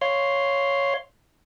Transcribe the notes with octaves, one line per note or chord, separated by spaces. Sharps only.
C#5 F5 C6